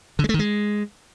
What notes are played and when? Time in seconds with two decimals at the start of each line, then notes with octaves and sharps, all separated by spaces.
0.19 D3
0.24 G#3
0.29 A3
0.34 D#3
0.39 G#3